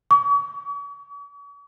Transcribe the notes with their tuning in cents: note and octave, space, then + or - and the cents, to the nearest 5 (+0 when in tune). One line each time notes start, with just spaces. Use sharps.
C#6 +45